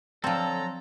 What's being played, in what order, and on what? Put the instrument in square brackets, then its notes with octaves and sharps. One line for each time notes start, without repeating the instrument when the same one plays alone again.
[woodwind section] D3 F#3 [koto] F3 C4 [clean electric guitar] A4 [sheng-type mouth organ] A#5